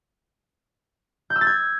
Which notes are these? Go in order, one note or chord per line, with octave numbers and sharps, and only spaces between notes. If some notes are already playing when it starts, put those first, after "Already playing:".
G6
E6
A6
G#6